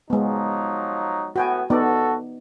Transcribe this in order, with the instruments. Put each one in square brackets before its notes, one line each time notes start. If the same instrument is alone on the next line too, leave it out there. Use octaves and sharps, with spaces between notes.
[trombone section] F3 F#3 D#4 [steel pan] G#3 B3
[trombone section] A2 B3 [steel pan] F#4 G5 G#5
[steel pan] B3 D#4 D5 [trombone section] F#4 A4